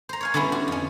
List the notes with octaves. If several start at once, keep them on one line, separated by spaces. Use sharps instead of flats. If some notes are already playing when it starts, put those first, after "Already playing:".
C5 A#5
C#5 F5 G#5
D3 G3 B3 C#4 E4
F#4
F2 C#4